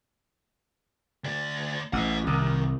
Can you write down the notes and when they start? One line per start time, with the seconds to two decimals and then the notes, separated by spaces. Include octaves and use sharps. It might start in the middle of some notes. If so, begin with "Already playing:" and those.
1.24 D2 D5
1.93 A1 D#5 F#5
2.27 C2 D#3